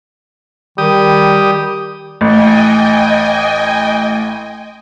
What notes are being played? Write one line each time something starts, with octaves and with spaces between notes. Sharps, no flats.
D#3 G3 G4 D#6
A1 D#5 G5 G#5